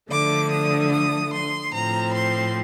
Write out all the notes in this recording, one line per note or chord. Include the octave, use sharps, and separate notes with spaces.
D3 F3 A3 D4 D6
D#6
D#6
C6
A2 F3 C4 A#5
C6